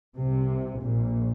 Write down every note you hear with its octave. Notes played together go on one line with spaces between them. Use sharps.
C2 C3
A#1 A#2